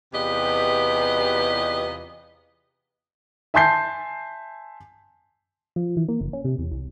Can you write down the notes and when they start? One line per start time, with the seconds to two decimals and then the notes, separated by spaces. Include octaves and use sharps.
0.13 E2 C3 F4 G4 B4 D#5
3.54 E5 G#5 A5 C6 G6 C7
5.76 F3
5.97 E3
6.08 A#3
6.21 F#1
6.33 C#4
6.45 C3
6.58 E2
6.71 C2